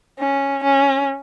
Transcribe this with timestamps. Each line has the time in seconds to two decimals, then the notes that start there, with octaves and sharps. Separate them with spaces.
0.19 C#4
0.64 C#4